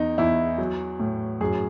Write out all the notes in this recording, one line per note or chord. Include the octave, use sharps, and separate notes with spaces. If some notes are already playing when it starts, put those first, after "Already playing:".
Already playing: E2 D#4
E2 E4
F#3
A2
F#2 G#4